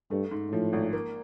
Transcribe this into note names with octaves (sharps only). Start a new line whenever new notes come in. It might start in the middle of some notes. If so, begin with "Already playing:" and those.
G2 A3
G#2
A2 F3
G#1
A#3